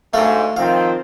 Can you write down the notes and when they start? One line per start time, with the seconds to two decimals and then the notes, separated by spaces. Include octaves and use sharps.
0.14 D2 G#2 A3 F5
0.57 D#3 F3 C4 F4 F5